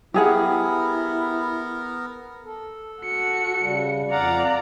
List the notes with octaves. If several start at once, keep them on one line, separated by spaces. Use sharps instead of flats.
B3 E4 G4 G#4 A#4 F#5
A4
F#4 C#7
C#3 G3
F2 D5 F5 F#5 A#5